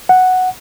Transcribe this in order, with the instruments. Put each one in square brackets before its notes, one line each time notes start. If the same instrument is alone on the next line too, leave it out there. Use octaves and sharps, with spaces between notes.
[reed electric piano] F#5